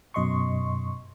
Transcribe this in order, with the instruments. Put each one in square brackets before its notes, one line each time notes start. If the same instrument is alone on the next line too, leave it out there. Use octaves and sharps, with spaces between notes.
[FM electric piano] F#2 B2 D#5 C6 C#6